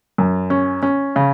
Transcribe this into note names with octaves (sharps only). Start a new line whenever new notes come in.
F#2
C#4
C#4
C#3